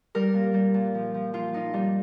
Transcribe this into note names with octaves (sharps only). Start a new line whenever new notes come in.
G3 A#4
A#2
G3
A#2
F3
F3
F3 F4
F3 D#4
G3 D#4